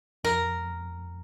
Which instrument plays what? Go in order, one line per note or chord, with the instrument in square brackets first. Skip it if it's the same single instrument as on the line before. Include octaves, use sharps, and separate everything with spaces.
[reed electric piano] F2 [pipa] A#4